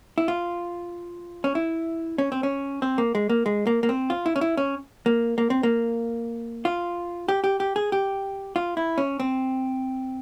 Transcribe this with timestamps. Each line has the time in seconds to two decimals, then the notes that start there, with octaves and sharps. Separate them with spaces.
0.18 E4
0.28 F4
1.44 C#4
1.55 E4
2.18 C#4
2.32 C4
2.43 C#4
2.82 C4
2.98 A#3
3.15 G#3
3.30 A#3
3.46 G#3
3.67 A#3
3.83 A#3
3.89 C4
4.10 F4
4.26 E4
4.36 C#4
4.41 E4
4.57 C#4
5.06 A#3
5.38 A#3
5.50 C4
5.63 A#3
6.65 F4
7.28 G4
7.44 G4
7.60 G4
7.76 G#4
7.92 G4
8.56 F4
8.77 E4
8.98 C#4
9.20 C4